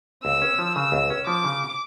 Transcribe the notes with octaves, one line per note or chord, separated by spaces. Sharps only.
C#2 E6
C#4
F3
C#3 E6
C#2
C#4
F3 D6
C#3